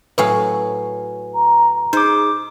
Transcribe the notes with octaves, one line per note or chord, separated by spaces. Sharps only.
A2 F#3 B4 F5 G#5
A#5
D#4 G#4 C5 D6